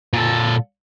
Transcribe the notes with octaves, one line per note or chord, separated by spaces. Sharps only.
A#2 A4